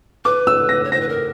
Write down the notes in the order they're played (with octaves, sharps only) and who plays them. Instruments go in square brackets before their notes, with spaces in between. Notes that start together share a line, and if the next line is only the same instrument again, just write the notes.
[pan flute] B4 [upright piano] D6
[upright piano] E6
A#6
[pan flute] C#5
[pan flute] C5 [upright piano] A#6
[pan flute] B4
A#4